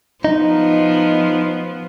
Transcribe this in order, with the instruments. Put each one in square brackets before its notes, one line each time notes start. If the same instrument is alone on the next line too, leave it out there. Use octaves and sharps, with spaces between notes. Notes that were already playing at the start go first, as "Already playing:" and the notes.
[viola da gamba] F3 B3 [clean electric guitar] D#4